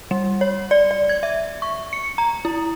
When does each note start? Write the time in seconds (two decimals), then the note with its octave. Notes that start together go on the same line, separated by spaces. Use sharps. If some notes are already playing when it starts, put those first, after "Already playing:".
0.11 G3
0.41 C#5
0.71 D5
0.91 D5
1.09 G#6
1.23 E5
1.62 C#6
1.93 C#7
2.18 A#5
2.45 E4